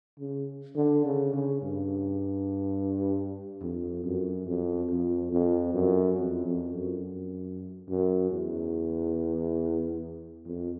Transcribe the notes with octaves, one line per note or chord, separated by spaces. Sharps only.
C#3
D3
C#3
C#3
G2
F2
F#2
F2
F2
F2
F#2
F2
F2
F#2
F#2
E2
F2